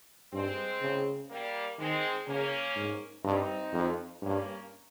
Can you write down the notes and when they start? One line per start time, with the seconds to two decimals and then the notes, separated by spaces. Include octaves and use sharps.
0.32 G2 G#3 C4
0.82 C#3
1.30 G3 A#3
1.78 D#3 G#3 C4
2.27 C#3 A#3 C#4
2.76 G#2
3.24 G2 C4 D#4
3.73 F2
4.22 G2 A#3 C#4